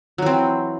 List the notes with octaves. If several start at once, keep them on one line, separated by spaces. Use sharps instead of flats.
E3 F#3 C4